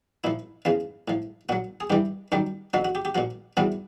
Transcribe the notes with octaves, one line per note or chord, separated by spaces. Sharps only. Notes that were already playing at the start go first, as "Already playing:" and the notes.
A#2 F3 E4
E2 C#3 F3 F4
A2 F3
A#2 F#3 F#4
G#4
G2 E3 G3 G4
F#2 D#3 G3 G4
F2 D3 F3 F#4
F#4
G4
G4
A#2 F3 F#4
E2 C3 E3 G3 F#4